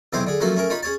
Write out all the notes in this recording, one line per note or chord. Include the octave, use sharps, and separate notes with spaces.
B1 E2 C3 C4 C5 G#5
D3 G#4
F3 F#3 A3 A#3 C#4 F#4
A3 C#4 G#4 A#4
D#4 F4 C#5 B5
C#4 G#4 C#5 A5